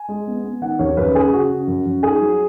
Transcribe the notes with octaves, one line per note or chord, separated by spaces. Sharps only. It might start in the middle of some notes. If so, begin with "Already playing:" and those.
Already playing: G#5
G#3
B3
B3
D#3 F#5
D#2 C#5
F#2 B4
C#3 G#4
C#3 F#4
C#3
F#2
F#2
D#4 G#4
F#3